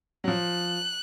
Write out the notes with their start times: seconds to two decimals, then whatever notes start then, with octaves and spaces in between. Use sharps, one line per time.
0.24 F#3
0.27 F3 F#6